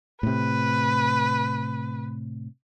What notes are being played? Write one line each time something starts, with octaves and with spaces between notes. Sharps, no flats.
A2 C3 B4